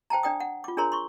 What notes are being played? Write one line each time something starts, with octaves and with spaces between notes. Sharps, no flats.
C5 G5 A5 A#5
D4 D5 G5 D#6
F#5
F4 D6
D4 G#4 A#4 C#5 A#5 C6
C6 C#6